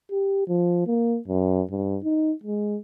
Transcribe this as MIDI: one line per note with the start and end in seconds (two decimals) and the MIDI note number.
0.11 0.43 67
0.47 0.83 53
0.87 1.18 58
1.28 1.62 42
1.70 1.98 43
2.03 2.32 63
2.44 2.78 56